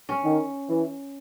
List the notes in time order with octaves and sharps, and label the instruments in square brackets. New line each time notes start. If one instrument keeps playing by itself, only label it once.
[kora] C#4
[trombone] D#3
E3